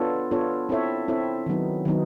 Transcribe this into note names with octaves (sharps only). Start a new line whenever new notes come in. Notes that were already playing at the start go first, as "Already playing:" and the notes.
Already playing: B3 D4 F4 A4 C#5
B3 D4 F4 A4 C#5
C4 E4 A4 C#5 E5
C4 E4 A4 C#5 E5
D#3 F#3 B3 D#4
D#3 F#3 B3 D#4